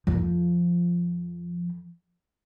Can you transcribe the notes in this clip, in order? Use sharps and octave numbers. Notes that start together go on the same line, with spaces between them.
F2 F3